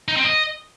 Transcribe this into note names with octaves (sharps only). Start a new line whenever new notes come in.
D#4
C4
D#5